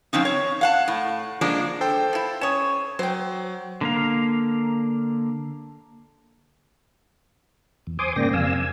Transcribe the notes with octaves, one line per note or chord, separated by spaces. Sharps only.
F3 C4 C#4 D#4
C#5
F5 F#5 A5
A2
F3 G#3 A#3 D4
A4 C5 G5
F3 E4
C#4 C#5 D#6 E7
F#3 C5 G5
D3 A#3 F5
E2
C5 G#5 C6 D6 D#6
G#2 C#3 A#3 D5 G5 A#6
F2 C3 F5 G#5 E6
G#5